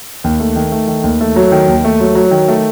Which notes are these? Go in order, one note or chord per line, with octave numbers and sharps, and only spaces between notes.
D#2
A3
D#3
A3
D#3
D#2
A3
F#3
D#3
D#2
A3
F#3
F#3
D#3
A3